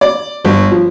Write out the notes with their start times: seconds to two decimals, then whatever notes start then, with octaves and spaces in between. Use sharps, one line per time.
0.01 D5
0.45 G1
0.72 F3